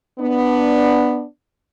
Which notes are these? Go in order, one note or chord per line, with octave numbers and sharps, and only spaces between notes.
B3 D4